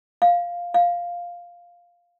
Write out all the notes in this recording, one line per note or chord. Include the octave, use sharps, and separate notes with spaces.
F5
F5